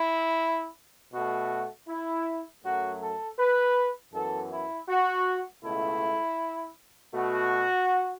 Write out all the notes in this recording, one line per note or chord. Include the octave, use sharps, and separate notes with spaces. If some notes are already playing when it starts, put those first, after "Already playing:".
Already playing: E4
B2 A3 F#4
E4
F#2 F#3 A3 F#4
A4
B4
F#2 E3 B3 A4
E4
F#4
C#2 B2 A3 E4
B2 A3 F#4